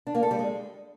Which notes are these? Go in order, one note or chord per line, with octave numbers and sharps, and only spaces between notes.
D4
A#3
A4
G3
G#3